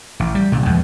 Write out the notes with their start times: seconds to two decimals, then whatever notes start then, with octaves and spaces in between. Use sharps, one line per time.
0.20 A1
0.35 G3
0.52 C2 A#2 D3
0.66 E2 F3 G#3